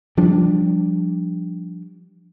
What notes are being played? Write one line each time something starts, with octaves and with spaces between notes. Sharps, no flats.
F3 G3 D4